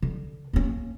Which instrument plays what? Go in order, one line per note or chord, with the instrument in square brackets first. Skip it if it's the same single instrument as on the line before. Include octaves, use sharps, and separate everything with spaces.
[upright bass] D3
A#3 C#4